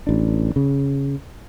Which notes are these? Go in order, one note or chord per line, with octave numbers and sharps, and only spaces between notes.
A1 D4
C#3